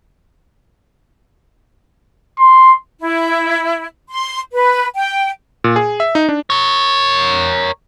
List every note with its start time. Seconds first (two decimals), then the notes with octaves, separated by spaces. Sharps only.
2.38 C6
3.00 E4
4.09 C6
4.54 B4
4.96 G5
5.64 A#2
5.76 G#4
6.00 E5
6.15 D#4
6.29 D4
6.50 A#4 C#5